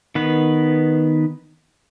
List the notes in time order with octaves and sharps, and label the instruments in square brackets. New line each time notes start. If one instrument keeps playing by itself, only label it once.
[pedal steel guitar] D#3 B3 B4